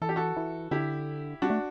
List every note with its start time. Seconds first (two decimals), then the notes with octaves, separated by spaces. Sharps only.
0.02 E3 A4
0.09 G4
0.16 F#4 A4
0.37 E3
0.71 D3 E4 G4
1.42 G3 D4 F#4
1.50 A3